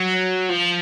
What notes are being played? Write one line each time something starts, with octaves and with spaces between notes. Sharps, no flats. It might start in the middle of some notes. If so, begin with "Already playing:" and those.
Already playing: F#3
F3